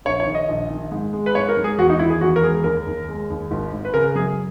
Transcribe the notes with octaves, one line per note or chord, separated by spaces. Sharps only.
A#1 C#5
C#5
D#3
D#5
A#1
D#3
G#2
G#3
B4
G#2 C#5
A#4
G#2
G#4
E2 F#4
D#4
D#3 E4
G#4
E2 F#4
A#4
G#3 G#4
D#2 A#4
D#2
G#3
D#2
G#1
G#1
B4
C#3 A#4
F#2 G#4